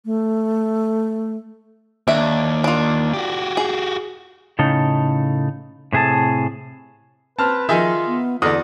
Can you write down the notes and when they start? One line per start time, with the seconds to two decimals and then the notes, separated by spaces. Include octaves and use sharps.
0.05 A3
2.08 D#2 D4 E5
2.64 D4 F4
3.14 F#4 G4
3.57 G#4
4.59 A2 C#3 D#4 A4
5.93 A2 C3 G#4 A4 A5
7.39 C4 B4 A5 F6
7.69 D#3 F3 D#4 F4 G#4 E5
8.07 B3
8.42 E2 D3 A4 D5 D#6